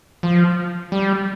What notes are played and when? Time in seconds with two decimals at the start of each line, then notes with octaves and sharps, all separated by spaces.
0.23 F3
0.92 G3